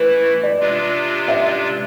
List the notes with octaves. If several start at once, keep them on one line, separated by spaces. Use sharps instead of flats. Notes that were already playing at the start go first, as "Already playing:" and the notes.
Already playing: E3 A3 E4 B4
D5
C3 G#3 D4 F4
E5